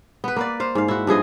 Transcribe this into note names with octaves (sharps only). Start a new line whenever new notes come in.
B3 B4
A#3 B4 D5
C5 F5
G#2 F5
E4 F#4
G2 F3 G#4 D#5